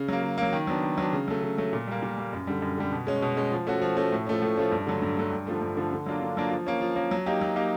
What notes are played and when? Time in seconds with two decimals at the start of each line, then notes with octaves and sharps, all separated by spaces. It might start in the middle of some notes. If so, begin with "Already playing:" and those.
Already playing: C#3
0.08 F#3 A#3
0.23 C#3
0.38 F#3 A#3
0.53 D#3
0.67 F#3 B3 D4
0.83 D#3
0.98 F#3 B3 D4
1.13 C#3
1.28 F#3 A3
1.42 C#3
1.58 F#3 A3
1.73 A#2
1.87 G3 A#3
2.03 A#2
2.18 G3 A#3
2.33 F#2
2.47 D3 G3
2.62 F#2
2.78 D3 G3
2.92 B2
3.07 G#3 C#4
3.22 B2
3.37 G#3 C#4
3.52 F3
3.67 A3 C#4 F#4
3.82 F3
3.97 A3 C#4 F#4
4.12 A2
4.27 F3 A3 C#4
4.42 A2
4.57 F3 A3 C#4
4.72 G2
4.87 D3 F#3 A3
5.02 G2
5.17 D3 F#3 A3
5.32 G2
5.47 D3 F3 A3
5.61 G2
5.77 D3 F3 A3
5.92 D3
6.06 F#3 A#3 D4 F4
6.22 D3
6.37 F#3 A#3 D4 F4
6.51 F3
6.67 A#3 C#4
6.81 F3
6.96 A#3 C#4
7.11 F#3
7.26 A#3 D#4 G4
7.41 F#3
7.56 A#3 D#4 G4